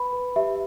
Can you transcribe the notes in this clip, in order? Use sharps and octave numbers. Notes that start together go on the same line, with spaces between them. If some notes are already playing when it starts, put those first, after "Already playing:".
Already playing: B4 B5
B4
G4 E5